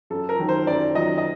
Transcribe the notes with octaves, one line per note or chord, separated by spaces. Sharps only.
F#2 A4
A#4
D#3 F#3
C5
F#2 D5
D#3 F#3 D#5
D#5